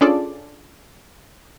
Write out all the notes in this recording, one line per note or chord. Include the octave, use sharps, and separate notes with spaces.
C#4 D4 F4 G#4 A4 D5